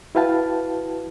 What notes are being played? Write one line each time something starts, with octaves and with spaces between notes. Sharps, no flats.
E4 F#4 B4 F5 G5 A5